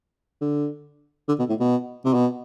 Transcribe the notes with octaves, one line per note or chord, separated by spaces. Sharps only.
D3
D3
B2
A2
B2
C3
B2